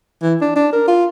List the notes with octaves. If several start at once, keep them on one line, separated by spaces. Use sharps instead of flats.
E3
D4
D4
A#4
F4